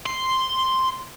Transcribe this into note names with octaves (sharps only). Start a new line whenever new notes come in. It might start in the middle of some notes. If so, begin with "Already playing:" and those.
C6